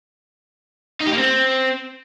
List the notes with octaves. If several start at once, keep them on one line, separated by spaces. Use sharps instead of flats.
D#4
G4
A#3
C4